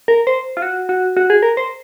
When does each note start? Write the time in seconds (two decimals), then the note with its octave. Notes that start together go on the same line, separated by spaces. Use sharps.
0.08 A#4
0.27 C5
0.57 F4
0.62 F#4
0.89 F#4
1.17 F#4
1.30 G#4
1.43 A#4
1.57 C5